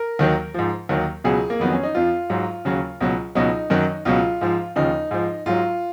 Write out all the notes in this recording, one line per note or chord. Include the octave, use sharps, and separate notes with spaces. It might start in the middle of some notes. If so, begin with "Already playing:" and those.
Already playing: A#4
D#2 D#3 F#3
G#2 F3
D#2 D#3 F#3
C#2 B2 F#3 G#4
A#3
F2 D#3 F#3 B3
C#4
D#4
F2 F3 F4
G#2 F#3
D#2 C#3 F#3
C#2 B2 F#3
C#2 B2 F#3 D#4
F#2 D#3 F#3
C#2 B2 F#3 F4
G#2 F3
D#2 C#3 F3 D#4
G#2 F3
G#2 F#3 F4